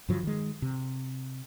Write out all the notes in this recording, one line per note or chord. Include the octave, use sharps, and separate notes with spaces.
G2 D3 F3 F#3
D#3 G#3
C3